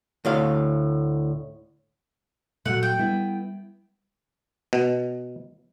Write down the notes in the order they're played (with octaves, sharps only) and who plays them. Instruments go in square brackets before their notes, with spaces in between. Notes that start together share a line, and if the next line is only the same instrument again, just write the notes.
[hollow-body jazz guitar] D2 A2 F5
[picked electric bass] A#2 [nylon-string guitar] F#3 A3 [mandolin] F#5
[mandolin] G5
[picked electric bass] G3 [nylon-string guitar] B3 E4
[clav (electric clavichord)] B2